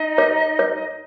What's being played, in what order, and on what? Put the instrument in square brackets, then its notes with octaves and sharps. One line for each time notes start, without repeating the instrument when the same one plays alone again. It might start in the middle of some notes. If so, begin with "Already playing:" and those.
Already playing: [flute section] D#4 D#5
[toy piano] C#5
C#5